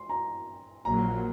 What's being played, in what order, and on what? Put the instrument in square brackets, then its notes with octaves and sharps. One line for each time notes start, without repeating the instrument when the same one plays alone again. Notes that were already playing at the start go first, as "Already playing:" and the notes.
Already playing: [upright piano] C6
A#5
[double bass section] A#1 A#2 F#3 A#3 [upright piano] A#5